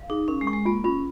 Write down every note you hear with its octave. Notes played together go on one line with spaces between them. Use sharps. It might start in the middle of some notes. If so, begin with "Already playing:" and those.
Already playing: F5
D#4 G#4
C#4 A#4
G#3
C#6
G#3
A#3 F4
C#4 F4